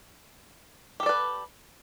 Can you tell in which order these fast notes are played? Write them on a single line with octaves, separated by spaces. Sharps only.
G4 A4 D5 B4